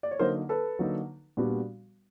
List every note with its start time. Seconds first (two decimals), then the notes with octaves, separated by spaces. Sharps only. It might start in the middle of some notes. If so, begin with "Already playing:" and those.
0.03 D5
0.11 C#5
0.19 D3 F#3 A#3 D#4 A#4 C5
0.49 A4 B4
0.79 D3 F#3 A#3 D#4
1.37 A#2 G3 B3 D4 F#4